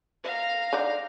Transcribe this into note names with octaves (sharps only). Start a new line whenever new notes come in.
F5 A#5
D3 D#4 D5